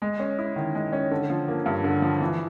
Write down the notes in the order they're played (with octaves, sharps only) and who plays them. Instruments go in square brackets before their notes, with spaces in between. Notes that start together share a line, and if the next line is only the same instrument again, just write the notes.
[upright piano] G#3
C#4
E4
D#3
G#3
C#4
D3
F3
A#3
G2
D3
F3
E3